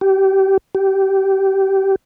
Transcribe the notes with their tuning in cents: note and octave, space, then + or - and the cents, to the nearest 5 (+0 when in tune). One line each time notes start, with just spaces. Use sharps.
G4 -25
G4 -20